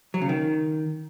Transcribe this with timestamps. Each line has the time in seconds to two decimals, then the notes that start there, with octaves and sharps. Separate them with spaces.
0.14 F#3
0.22 C#3
0.29 D#3